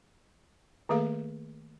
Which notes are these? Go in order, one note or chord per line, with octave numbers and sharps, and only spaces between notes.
D#3 A3 A#3 G#4 A4 F5